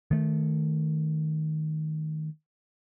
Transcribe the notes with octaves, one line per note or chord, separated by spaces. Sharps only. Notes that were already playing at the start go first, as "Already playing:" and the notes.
D#3 A3